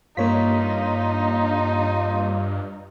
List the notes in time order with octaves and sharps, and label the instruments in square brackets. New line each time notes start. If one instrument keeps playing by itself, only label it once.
[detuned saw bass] G2 [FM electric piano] A#3 C#5 B6 [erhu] D#4 [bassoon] F4